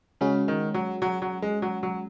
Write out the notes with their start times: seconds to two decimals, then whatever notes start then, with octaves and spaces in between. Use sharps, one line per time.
0.21 C#3 G#3 C#4 F#4
0.48 D#3
0.74 F#3
1.02 F#3
1.22 F#3
1.42 G#3
1.62 F#3
1.83 F#3